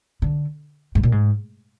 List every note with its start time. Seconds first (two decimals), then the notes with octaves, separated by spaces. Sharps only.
0.22 D3
0.95 G#2
1.03 A#2
1.12 G#2